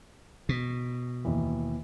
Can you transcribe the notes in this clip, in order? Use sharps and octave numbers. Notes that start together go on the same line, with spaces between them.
B2
D#2 E3